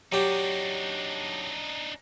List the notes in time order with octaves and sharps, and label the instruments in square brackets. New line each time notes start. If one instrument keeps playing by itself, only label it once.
[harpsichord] F#3 G4 [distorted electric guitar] D4 D#4